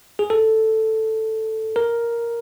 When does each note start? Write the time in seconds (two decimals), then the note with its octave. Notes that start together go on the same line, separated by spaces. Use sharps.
0.19 G#4
0.30 A4
1.76 A#4